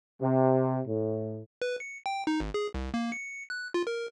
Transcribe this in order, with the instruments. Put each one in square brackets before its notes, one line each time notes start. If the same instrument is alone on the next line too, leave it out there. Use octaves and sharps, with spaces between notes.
[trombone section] C3
A2
[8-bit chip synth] B4
C#7
G5
D#4
G#1
G#4
C2
A#3
C#7
F#6
F4
A#4